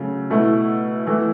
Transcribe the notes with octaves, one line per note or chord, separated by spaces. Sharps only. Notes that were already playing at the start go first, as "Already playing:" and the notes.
Already playing: C#3 F#3 A3
B2 A3 E4
E3 A3 E4